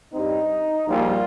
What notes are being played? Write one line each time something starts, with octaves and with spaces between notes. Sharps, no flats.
G2 G3 C4 D#4
A#1 A#2 G3 F4